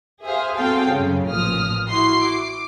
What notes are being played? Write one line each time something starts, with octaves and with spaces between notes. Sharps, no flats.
G4 G#4 C5 E5 F5
C4 F#4 G#4 A4 F5 G5
F#2 C#3
A1 A#2 F3 D#6 F6
E4 F#4 C6 C7
D6